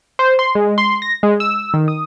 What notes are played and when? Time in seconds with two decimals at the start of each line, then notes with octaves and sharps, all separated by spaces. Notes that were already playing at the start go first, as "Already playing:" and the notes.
0.19 C5
0.39 C6
0.55 G#3
0.78 C6
1.02 A#6
1.23 G#3
1.40 E6
1.74 D#3
1.88 D#6